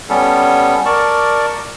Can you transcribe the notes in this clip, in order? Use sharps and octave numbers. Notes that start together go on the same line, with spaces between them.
G3 B3 C#4 A4
A#4 D5 A5 C#6